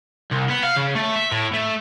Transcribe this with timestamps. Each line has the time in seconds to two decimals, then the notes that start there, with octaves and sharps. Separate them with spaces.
0.31 C2
0.49 B3
0.63 F5
0.76 C#3
0.95 A3
1.16 E5
1.32 A2
1.54 A3